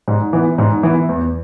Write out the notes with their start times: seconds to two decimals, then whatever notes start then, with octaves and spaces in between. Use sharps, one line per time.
0.08 G#2
0.33 E3 B3
0.58 G#2
0.83 E3 B3
1.09 E2